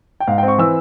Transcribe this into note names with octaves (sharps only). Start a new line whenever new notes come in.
G5
G#2 F5
C4 G5
C#6
E3 E6